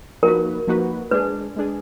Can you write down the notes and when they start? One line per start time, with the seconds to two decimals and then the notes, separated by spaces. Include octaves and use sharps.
0.23 F3 A#3 D#4 F#4 A#4 B4
0.67 F3 A#3 D#4 F#4 B4
1.11 G#3 D4 G#4 B4
1.56 G#3 D4 G#4